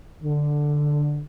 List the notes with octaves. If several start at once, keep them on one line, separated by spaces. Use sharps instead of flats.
D3